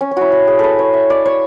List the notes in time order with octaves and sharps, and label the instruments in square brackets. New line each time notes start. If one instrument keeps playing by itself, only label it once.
[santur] C#4
C#4
E4 F#4
F#4
G#4
A4 B4
C#5
E5
D5
C#5